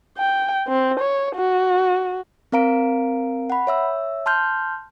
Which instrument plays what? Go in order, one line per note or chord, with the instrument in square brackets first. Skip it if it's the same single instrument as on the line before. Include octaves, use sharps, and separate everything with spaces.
[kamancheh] G5
C4
C#5
F#4
[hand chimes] C4 A#4 F5 A#5 D7
F#5 B5
C#5 E5 E6
A5 C6 F6 G6